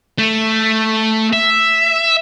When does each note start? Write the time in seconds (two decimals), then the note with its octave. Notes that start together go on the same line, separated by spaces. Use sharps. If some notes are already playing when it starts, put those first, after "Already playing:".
0.18 A3
1.33 E5